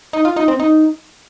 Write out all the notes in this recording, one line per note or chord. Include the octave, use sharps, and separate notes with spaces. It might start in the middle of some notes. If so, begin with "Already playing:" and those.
D#4
F4
D#4
C4
D#4